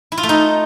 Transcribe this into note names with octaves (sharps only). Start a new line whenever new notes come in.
E4
F4
A3
D#4